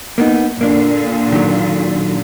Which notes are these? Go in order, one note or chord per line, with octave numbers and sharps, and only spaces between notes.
A#3 B3 D#4
A#2 D3 A#3 D4
D#3 F#3